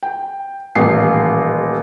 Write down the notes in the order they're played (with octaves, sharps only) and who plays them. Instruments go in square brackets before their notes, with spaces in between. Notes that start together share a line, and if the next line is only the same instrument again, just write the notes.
[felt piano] G5
D#1 A1 C7